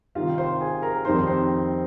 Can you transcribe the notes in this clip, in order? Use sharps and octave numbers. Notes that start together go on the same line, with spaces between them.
C3 D#3 G3 F4 F5
C5 C6
G#4 G#5
A#4 A#5
F2 D#3 G3 C4 D#4 C5 C6
C5 C6